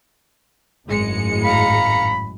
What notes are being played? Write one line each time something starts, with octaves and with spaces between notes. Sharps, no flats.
G#1 F#2 A2 G#3 C#7
F5 A#5 B5